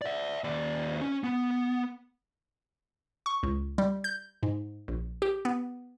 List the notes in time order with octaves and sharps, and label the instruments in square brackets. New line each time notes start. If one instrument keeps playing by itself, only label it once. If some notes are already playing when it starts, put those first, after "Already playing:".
[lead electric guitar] D5 E5
D#2 D5
C#4
B3
[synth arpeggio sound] C#6
C#2
G3
G6
G#2
A#1
G4
B3